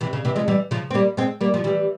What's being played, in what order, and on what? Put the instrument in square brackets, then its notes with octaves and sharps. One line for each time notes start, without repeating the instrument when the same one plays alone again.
[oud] C3 E3
C#3
C3 E3
F3 G#3
E3 G3
C#3 F3
C4
G3 A#3
G#3 C4
G3 A#3
F3
E3 G3